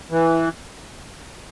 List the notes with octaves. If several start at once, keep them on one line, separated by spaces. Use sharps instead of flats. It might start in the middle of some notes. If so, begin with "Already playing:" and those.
E3